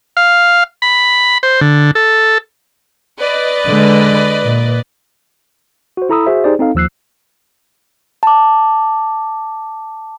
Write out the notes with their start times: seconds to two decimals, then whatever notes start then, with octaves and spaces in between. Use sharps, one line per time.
0.17 F5
0.82 B5
1.43 C5
1.61 D3
1.95 A4
3.20 B4 D5 D#5
3.66 D3 G#3
4.43 A#2
5.97 F#4 C5
6.09 E4 A4 A#5 B5 D#6 E6
6.26 F#4 G#4 C5 E5
6.44 D#4 G4 G#4 C5 D5
6.59 C4 D#4 A4 F5
6.75 D#2 F3 E6 F#6 C7
8.23 A5 D6